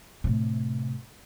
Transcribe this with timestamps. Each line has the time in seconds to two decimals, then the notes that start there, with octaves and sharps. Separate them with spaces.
0.24 A2 C3